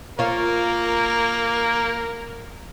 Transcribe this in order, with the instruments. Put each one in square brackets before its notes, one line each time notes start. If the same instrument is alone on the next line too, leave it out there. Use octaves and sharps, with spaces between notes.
[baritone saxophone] A#3 [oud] F4 C#5 [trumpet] A#4